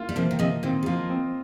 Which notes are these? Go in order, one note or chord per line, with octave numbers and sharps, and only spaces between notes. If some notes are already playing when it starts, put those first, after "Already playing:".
Already playing: A#3 F4
G3
C3 F3 A#3
D#3
C3 F3 D#5
A#2 D#3 C4
G3
F3 A#3 F4
C4